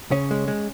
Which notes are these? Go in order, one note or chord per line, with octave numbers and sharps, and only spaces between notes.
C#3 C#4
G#3
G#3